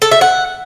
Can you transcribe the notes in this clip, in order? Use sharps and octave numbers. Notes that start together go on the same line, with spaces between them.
A4
E5
F#5